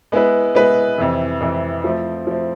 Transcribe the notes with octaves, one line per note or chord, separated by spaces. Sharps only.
G#3 B3 E4 B4
G#3 B3 E4 B4
F2 C3 E3
F2 C3 E3
F3 A3 C4
F3 A3 C4